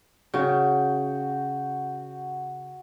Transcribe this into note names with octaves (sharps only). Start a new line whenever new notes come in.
C#3 F#4 G5